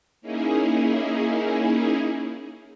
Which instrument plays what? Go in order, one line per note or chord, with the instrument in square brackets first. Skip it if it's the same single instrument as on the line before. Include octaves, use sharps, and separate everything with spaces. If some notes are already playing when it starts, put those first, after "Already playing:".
[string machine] A#3 C#4 D#4 E4 G#4